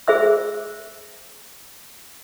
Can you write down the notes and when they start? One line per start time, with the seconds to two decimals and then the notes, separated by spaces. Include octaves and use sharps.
0.08 G#4 C5 E5 E6